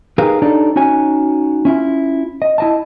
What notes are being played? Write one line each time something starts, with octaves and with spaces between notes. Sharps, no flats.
D#4 G4 G#4 A#4 B4 F5
D4 D#4 G4 A4 C#5 D5
C#4 D#4 F#4 C#5 G#5
C#4 E4 F4
D#5
E4 D#5 A5